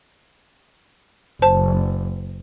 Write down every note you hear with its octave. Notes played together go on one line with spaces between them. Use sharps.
F#1 C5 A5